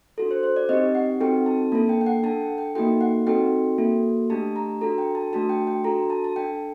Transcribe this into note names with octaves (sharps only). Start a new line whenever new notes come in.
D4 F#4 A4
C5
C5
D5
C4 D#4 G4 D#5
F#5
C4 D#4 F#4 A4 G5
A5
A#3 D4 A4 A5
G5
G5
F#5
D4 A4 A5
G5
G5
A#3 D#4 F#4 A4 G5
F#5
C4 D#4 F#4 A4 G5
A#3 F#4 A4
A3 D4 G4 A5
A#5
D4 F#4 A4 A#5
G5
A5
A3 D4 F#4 A5
G5
G5
D4 F#4 A4 A#5
A5
A5
D4 A4 G5